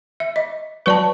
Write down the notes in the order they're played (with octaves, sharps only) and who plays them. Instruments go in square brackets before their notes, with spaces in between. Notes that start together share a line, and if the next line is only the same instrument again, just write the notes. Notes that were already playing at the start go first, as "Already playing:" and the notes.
[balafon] E5
D#5
[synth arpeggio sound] F#3 C#6 [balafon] B4 D5 A5